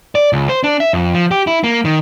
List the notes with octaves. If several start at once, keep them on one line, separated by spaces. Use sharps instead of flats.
D5
C#2
C5
D4
E5
F2
F3
G4
E4
A#3
D#3